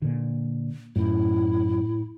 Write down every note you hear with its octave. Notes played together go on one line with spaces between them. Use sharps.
A#2 D3
F#2 A2 E4